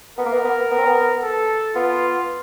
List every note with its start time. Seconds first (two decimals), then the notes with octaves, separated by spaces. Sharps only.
0.18 B3 A#4
0.26 A#3
0.34 B3
0.45 B3
0.71 B3
0.78 C4
0.85 B3
1.23 A4
1.76 B3 F4